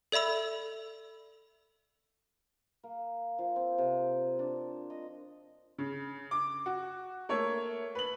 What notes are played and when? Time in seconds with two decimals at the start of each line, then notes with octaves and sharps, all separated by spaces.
0.12 A4 D5 E5 B5 E6
2.83 A#3
3.39 F3
3.56 C4
3.78 C3
4.39 D4
4.90 D#5
5.78 C#3
6.31 D6
6.66 F#4
7.29 A3 A#3 C#5
7.95 B4 F#7